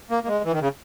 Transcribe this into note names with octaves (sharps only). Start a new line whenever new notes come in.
A#3
A#3
G#3
E3
D#3
C#3